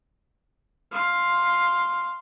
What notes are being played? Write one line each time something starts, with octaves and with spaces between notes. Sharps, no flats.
F5 C6